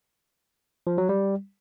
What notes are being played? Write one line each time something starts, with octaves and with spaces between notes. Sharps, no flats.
F3
F#3
G3